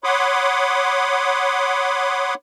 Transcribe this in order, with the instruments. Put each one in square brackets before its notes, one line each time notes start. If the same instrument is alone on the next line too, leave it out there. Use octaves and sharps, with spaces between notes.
[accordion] C#5 F#5 B5 C6 D6 D#6